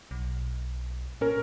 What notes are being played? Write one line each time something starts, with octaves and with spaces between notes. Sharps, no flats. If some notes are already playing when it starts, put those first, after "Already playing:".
B1
A#2 C#4 A#4